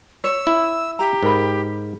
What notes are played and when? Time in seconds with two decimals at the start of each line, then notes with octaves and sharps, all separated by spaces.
0.24 C#5 E6
0.47 E4
0.99 G4 A#5
1.23 G#2 A#4 B5